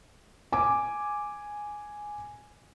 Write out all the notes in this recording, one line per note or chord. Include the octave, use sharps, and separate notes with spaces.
G#5 D6